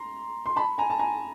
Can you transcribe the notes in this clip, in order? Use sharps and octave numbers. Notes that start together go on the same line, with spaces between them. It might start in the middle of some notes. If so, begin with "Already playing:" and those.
Already playing: A#5 C6
C6
A5 B5
G#5 A#5
A5
G#5 A#5